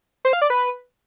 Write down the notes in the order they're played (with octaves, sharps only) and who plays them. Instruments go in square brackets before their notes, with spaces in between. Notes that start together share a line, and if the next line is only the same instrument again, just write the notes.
[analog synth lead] C5
F5
D5
B4